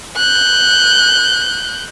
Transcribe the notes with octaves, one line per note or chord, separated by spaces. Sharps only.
F#6 G6